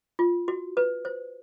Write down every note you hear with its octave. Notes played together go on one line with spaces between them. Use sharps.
F4
F#4
B4
C5